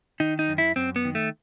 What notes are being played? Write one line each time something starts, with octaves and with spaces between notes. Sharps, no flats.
D#3 D#4
D#4
F#2
E4
F#2 C4
B3
D#3
A3